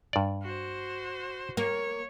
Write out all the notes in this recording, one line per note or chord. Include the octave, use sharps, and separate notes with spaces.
G2 D5
F#4 C5
A#3 C#5